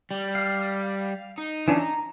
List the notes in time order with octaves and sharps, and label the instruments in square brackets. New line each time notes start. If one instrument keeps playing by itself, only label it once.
[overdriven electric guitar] G3
[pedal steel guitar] F5
[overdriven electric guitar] D#4
[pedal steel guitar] E3 C#4 D4
A#5